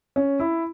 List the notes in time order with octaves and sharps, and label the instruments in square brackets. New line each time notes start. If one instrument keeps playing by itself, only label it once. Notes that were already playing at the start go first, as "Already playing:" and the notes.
[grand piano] C#4
E4